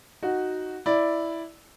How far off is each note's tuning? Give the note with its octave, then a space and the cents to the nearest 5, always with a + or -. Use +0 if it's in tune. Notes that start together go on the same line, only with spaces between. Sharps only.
D#4 +0 F#4 +0
E4 +0 D5 +0